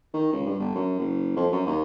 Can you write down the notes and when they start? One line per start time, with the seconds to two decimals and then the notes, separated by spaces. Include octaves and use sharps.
0.13 D#3
0.33 C#2
0.46 G2
0.60 G1
0.75 F#2
0.99 F#1
1.36 F2
1.52 F#2
1.66 D#2